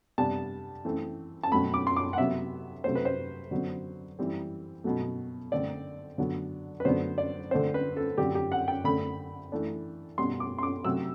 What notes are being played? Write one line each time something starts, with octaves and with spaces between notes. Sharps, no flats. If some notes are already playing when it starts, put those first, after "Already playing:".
C3 G3 B3 D4 A5
E3 A3 C4
A5
B2 F#3 A3 C4 B5
D6
C6
D6
F#5
C3 F#3 B3 E5
C3 F#3 A3 C5
B4
C5
D3 F#3 B3
E3 G3 C4
B2 F#3 A3
D3 A3 C4 D5
D3 F#3 B3 D4
B4
D3 F#3 B3 D4 C5
D5
D3 A3 C4 C5
B4
A4
D3 F#3 C4 G4
G4
F#5
G5
D3 A3 C4 B5
E3 A3 D4
B2 G3 B3 C6
D6
C6
D6
C3 F#3 A3 C4 E6